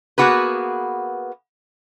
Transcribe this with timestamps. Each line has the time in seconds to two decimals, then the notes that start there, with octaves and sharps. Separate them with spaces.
0.18 A#3 B3 F#4 G#4 B4